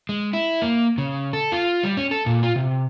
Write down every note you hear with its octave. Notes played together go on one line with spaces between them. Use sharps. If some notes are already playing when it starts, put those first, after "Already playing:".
G#3
E4
A#3
C#3
A4
F4
G3
C#4
A4
A#2
F4
C3